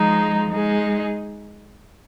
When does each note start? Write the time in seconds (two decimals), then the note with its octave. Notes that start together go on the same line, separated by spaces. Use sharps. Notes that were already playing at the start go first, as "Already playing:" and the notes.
Already playing: F3 G#3 D#4
0.52 G#3 D#4 G#4